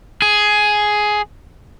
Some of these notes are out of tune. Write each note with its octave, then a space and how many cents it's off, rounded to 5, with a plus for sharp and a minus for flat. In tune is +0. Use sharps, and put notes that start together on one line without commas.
G#4 +10